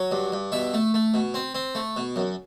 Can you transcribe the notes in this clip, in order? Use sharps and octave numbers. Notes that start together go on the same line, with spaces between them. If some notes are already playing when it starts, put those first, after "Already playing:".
Already playing: F#3
G2
G2
B2 E5
A3
A3
B2
C4
C4
A3
B2
F#2